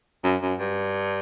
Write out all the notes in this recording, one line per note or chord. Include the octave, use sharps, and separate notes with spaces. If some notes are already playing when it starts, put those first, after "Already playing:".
F#2
F#2
G2